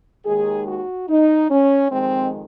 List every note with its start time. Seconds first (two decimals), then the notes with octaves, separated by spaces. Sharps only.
0.25 D#2 D#3 G#3 G#4
0.67 F#4
1.09 D#4
1.50 C#4
1.91 F2 D#3 G#3 C4